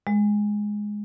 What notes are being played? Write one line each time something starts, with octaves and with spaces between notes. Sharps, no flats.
G#3